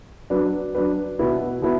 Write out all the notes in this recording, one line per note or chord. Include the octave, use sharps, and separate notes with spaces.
F#3 D4 B4
F#3 D4 B4
B2 B3 E4 B4
B2 B3 E4 B4